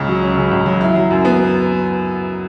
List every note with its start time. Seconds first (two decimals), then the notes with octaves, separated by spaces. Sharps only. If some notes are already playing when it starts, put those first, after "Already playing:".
Already playing: C#2 C#3 C#4
0.08 F#3
0.22 C#4
0.37 C#3
0.51 C#2
0.66 F#3
0.81 E4
0.96 F#3
1.11 F#2
1.25 B3